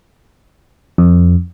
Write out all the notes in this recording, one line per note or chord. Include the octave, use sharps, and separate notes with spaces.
F2